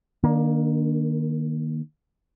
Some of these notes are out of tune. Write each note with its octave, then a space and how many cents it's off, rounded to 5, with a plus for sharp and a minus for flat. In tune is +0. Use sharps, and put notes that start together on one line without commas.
D#3 -20 A#3 +20 D4 +0